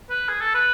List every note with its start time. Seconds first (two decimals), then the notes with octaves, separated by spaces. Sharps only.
0.10 B4
0.29 G#4
0.41 A4
0.55 B4